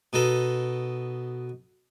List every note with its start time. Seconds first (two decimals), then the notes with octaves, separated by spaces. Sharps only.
0.13 B2 D#4 A4